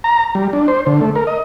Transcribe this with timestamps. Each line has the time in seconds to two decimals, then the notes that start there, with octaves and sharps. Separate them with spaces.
0.04 A#5
0.35 G3
0.53 D4
0.68 C5
0.86 D3
1.01 A3
1.16 A#4
1.27 D#5